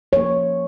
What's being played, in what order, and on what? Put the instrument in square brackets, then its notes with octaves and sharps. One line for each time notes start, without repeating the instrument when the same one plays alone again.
[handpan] F3 A#3 C#5